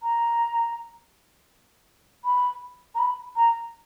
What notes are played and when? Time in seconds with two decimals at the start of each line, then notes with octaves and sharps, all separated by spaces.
0.03 A#5
2.25 B5
2.95 A#5
2.99 B5
3.36 A#5